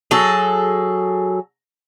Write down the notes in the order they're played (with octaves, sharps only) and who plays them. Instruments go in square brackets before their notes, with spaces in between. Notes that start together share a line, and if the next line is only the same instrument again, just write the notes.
[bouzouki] F#3 G#4 A4